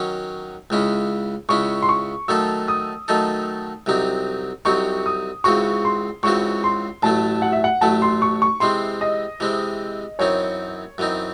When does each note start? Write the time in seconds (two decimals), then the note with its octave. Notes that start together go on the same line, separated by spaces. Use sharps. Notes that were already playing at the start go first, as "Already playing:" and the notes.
Already playing: D#3 F#3 C#4
0.70 C#2 C#3 G#3 C#4 E4
1.49 C#2 C#3 G#3 C#4 E4 C#6
1.82 C6
1.89 C#6
2.28 D#3 F#3 A3 D#4 A4 E6
2.68 D#6
3.08 D#3 F#3 A3 D#4 A4
3.86 C2 C3 F#3 C4 D#4
4.65 C2 C3 F#3 C4 D#4 C#6
5.06 D#6
5.44 C#2 C#3 E3 C4 F#4 C#6
5.85 C6
6.23 C#2 C#3 E3 C4 F#4 C#6
6.64 C6
7.03 A1 A2 F#3 A3 A5
7.42 F#5
7.52 E5
7.64 F#5
7.81 A1 A2 F#3 A3 A5
8.02 C6
8.22 C#6
8.42 C#6
8.60 C3 E3 G#3 C4 C6
9.01 D#5
9.40 C3 E3 G#3 C4
10.19 F#2 E3 C4 D#4 C#5
10.98 F#2 E3 C4 D#4